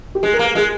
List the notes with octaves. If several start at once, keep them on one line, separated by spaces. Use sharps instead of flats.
G4
G#3 G#4
A#4
A#3
A#4
G#3 G#4